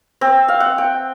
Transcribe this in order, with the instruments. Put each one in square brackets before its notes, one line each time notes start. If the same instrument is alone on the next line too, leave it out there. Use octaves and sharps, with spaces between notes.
[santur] C4
F5
F#5
G5